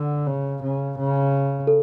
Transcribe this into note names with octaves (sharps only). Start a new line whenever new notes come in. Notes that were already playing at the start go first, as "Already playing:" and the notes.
Already playing: D3
C#3
C#3
C#3
A4